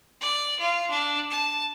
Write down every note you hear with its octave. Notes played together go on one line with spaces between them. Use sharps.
D5
F4
D4
A5